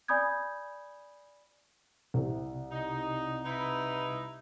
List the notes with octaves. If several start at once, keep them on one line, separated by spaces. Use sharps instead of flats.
D5 G#5 B5 D#6 G6 G#6
C2 C3
D#4
D#4 E4 B4